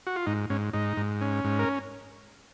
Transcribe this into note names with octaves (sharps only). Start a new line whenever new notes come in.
F#4
F4
G#2 D#4
G#2 C#4
G#2 D#4
G#2
C#4
G#2
A#4